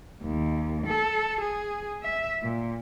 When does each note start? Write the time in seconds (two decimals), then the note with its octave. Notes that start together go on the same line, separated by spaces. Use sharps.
0.23 D#2
0.86 A4
1.41 G#4
2.03 E5
2.42 A#2